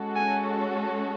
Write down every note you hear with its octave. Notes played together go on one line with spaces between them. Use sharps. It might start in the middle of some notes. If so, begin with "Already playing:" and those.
Already playing: G#3 C#4 F#4 A4
G#5